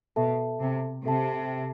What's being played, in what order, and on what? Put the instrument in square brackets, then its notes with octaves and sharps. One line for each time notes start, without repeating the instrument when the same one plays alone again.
[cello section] B2 [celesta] A4 E5 A5
[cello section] C3
[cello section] C3 [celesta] A4 E5 A5